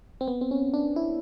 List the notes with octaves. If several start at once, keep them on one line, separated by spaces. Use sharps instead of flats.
C4
B3
C4
C#4
D4
E4